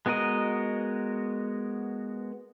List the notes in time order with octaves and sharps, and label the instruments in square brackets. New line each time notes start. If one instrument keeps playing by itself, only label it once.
[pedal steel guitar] G#3 B3 F#4 A#4 D#5